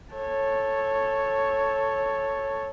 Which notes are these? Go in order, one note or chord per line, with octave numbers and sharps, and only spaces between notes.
A4 C#5